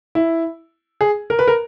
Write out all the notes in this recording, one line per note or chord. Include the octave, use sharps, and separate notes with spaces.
E4
G#4
A#4
B4
A#4